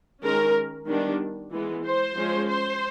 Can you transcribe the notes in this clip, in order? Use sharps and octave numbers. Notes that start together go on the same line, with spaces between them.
D#3 G#3 C#4 A#4
D#3 G3 B3 D4
E3 G#3 B3
C5
F3 G#3 C#4
C5